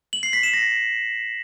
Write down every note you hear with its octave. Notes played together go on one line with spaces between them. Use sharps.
F#7
C7
B6
E7
A#6